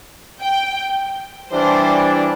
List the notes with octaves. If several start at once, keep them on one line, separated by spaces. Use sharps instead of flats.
G5
E3 G3 D4 C5